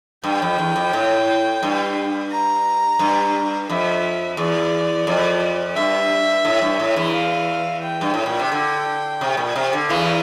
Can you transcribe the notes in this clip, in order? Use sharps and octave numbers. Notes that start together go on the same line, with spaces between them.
G2 G5
F2
E2
F2
A2
G2
A#5
G2
F2 E5
E2 D5
F2
G2 E5
A2
G2
A2
E2 E3
F5
G5
G2
A2
A#2
C3
D3
C3
A#2
C3
D3
E2 E3 F5